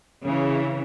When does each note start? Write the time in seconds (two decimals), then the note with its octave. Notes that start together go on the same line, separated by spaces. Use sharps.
0.23 C#3 E3